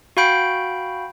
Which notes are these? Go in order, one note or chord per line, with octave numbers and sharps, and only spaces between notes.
F#4 F5 G5 B5 G6 D7